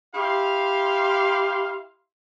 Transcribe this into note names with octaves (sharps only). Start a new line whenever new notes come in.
E4 G4 F5 C6